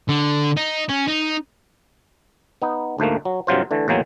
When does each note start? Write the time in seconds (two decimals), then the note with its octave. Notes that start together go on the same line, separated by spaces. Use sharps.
0.09 D3
0.57 D#4
0.89 C#4
1.08 D#4
2.62 B3 D#4
2.98 D2 G#2 A3 A#3
3.25 F#3
3.47 G2 C3 F#3 F4 C5
3.71 D3 E3 A3
3.88 E2 A2 D#3 F#3 A#3 G#5